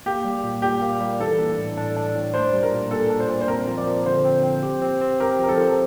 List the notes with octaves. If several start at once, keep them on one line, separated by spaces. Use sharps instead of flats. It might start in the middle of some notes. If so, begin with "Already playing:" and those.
A#3 G4
G3
A#2
A#2 G4
A#3
G3
E3 A4
D4
A2
D4
D4
A2
D4 C5
G3
A#4
A#2
A#2 A4
D4
C5
A#2
C5
C4 A#4
F3
D5
F3
D3 C5
C4
C4
G4
C4
C4
G4 A#4
F3
A#4
A4
F3